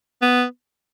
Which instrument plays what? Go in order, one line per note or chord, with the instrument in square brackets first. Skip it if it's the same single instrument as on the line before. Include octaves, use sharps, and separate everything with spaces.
[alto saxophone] B3